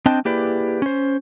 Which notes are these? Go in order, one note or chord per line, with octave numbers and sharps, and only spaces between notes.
C4 D4 D#5 G5 A5
A#3 E4 G4 G#4 B4 D5
C#4 C5